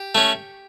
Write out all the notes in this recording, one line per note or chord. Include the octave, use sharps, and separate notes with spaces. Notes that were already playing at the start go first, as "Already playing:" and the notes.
Already playing: G4
A3 C#4